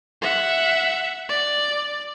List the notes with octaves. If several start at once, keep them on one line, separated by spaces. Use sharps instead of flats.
E5 F#5
D5